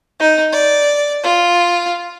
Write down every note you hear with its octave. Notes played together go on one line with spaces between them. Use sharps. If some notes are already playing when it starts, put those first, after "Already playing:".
D#4
D5
F4